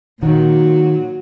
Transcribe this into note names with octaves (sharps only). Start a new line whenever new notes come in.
A#2 D#3 F#3